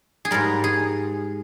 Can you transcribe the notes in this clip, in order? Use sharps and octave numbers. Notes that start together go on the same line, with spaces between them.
G#4
G#2 G3 A#4
G#4